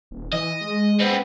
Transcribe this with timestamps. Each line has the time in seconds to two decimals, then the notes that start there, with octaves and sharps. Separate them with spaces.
0.11 D#1
0.33 E3 D#5
0.61 G#3
1.00 B3 C4